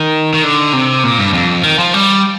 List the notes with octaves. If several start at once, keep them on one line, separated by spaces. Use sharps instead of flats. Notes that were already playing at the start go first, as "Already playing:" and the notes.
Already playing: D#3
D#3
D3
C3
A#2
G2
F2
D#3
F3
G3